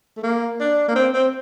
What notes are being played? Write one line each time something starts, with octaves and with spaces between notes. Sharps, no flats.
A3
A#3
D4
A#3
C4
C4